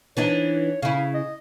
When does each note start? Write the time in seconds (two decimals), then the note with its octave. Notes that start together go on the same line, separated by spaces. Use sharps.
0.17 E3 D4 D#4 C#5
0.83 C#3 E4 F5
1.14 D#5